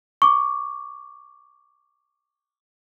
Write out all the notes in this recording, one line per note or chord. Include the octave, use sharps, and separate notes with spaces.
C#6 D6